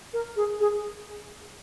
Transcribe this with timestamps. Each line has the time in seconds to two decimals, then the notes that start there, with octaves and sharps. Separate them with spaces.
0.14 A#4
0.36 G#4
0.60 G#4